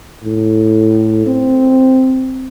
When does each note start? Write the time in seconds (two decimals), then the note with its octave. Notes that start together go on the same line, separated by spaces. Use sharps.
0.24 A2
1.26 C4